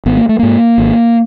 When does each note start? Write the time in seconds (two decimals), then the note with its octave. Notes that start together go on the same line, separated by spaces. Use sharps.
0.06 G#1 B3
0.17 A#3
0.29 A3
0.39 G#2 A#3
0.78 G#1